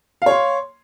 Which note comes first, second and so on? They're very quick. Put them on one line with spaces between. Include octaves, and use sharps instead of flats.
F5 C#5 C6